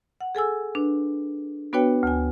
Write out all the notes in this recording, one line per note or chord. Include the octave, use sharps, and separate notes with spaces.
F#5
G#4 A4 G#5 E6
D4 B4
B3 D4 F#4 B4 C#5 G5
D2 G#5